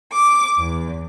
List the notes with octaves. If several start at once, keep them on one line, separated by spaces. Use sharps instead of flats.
D6
E2